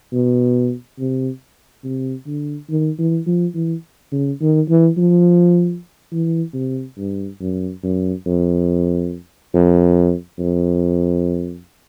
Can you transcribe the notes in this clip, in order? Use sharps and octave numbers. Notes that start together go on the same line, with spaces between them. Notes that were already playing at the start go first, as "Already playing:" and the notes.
B2
C3
C3
D3
D#3
E3
F3
E3
C#3
D#3
E3
F3
E3
C3
G2
F#2
F#2
F2
F2
F2